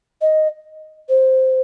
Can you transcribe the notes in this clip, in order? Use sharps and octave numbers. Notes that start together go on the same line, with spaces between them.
D#5
C5